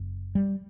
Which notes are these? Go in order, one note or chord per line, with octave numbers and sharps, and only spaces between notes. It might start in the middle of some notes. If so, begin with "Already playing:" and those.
Already playing: F#1 F#2
G3